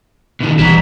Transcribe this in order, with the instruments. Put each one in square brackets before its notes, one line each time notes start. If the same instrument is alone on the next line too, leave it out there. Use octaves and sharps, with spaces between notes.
[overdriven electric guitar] B2 D#3
[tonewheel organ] G#1 B2 E3 [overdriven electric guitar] G3 A#5